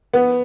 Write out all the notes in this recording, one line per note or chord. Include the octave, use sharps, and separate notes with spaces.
B3